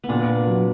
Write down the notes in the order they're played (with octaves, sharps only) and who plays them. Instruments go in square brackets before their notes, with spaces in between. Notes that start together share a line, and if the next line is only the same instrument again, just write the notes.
[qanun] B3
[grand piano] A#2 [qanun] D4
[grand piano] F#3